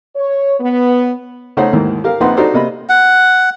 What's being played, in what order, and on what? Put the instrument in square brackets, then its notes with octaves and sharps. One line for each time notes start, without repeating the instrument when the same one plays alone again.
[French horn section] C#5
B3
[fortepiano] C#3 A3 C#4 D#4 C5 F#5
D#2 G#2 D#3 E3
G4 A#4 F5
A#1 C4 D#4 B4 F#5 C6
D4 D#4 F#4 G4 A4 C5
C3 A#3 D#5 B5
[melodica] F#5